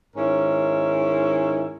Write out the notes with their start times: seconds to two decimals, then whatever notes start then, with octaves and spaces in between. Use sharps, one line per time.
0.16 G#2 D#3 C#4 E4 A#4